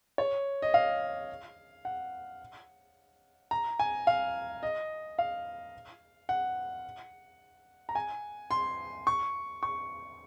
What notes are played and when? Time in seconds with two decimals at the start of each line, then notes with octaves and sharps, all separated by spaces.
0.18 C#5
0.62 D#5
0.74 F5
1.85 F#5
3.51 A#5
3.79 G#5
4.07 F5
4.63 D#5
5.19 F5
6.29 F#5
7.89 A#5
7.95 G#5
8.51 C6
9.07 C#6
9.63 C#6